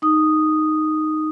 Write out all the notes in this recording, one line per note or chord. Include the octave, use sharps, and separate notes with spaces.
D#4 D#6